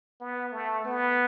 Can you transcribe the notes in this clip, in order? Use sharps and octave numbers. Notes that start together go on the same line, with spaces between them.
B3
A3
B3